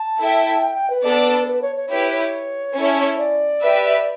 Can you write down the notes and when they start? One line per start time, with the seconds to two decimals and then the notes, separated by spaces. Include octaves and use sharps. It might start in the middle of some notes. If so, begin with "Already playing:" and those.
Already playing: A5
0.19 E4 A4 E5 G5
0.61 G5
0.76 G5
0.90 B4
1.04 B3 D4 A4 D5 A5
1.48 B4
1.62 C#5
1.76 C#5
1.90 E4 G4 B4 C#5
2.12 C#5
2.76 C#4 E4 A4
3.18 D5
3.62 G4 B4 E5